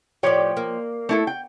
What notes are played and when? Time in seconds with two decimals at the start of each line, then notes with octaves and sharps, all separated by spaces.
0.23 A2 F3 G4 C#5 D5 G5
0.57 A#3
1.09 A3 E4 A4
1.27 G5